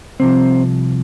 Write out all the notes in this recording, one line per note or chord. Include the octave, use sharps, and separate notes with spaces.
C2 C3 F3 C4